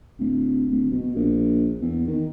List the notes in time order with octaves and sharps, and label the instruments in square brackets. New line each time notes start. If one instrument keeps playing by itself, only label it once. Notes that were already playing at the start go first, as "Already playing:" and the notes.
[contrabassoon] D1
D1
B2
A#1
E2
D#3